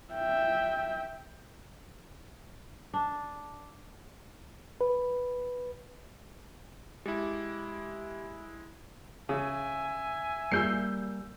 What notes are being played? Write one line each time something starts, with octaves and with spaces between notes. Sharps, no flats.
E5 G5
D4
B4
G#3 E4 G4
C#3 E5 G#5
G3 A#3 G#4 E6 G6 C7